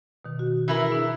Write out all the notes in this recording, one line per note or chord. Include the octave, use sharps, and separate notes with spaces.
B2 D#3
F#4
E3 E4 A#4
D4 G#4